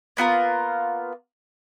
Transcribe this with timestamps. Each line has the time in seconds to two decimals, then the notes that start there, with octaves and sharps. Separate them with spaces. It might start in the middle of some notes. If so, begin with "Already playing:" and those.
0.17 A#3 B3 F4 A#4